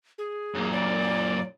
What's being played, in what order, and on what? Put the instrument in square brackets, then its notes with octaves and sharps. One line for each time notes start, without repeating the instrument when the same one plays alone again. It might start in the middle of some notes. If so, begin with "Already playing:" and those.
[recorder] G#4
[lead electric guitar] F#2 A#2
[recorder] D5